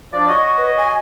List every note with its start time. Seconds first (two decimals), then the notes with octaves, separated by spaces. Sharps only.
0.13 F3 D4 D5
0.28 F#4 C#5 D#5 C#6
0.58 B4
0.77 G#5